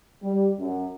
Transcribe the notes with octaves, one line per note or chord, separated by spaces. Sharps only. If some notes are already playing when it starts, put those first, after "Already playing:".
G3
F#2